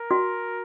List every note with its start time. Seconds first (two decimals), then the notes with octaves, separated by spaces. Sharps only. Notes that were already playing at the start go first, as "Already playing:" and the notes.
Already playing: A#4
0.11 F#4